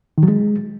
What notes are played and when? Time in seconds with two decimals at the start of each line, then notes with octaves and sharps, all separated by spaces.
0.18 D#3
0.23 F#3
0.28 G#3